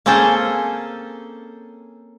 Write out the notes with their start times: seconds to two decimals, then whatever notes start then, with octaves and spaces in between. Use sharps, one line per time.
0.06 A#3 C4 C#4 G#4 A4 G5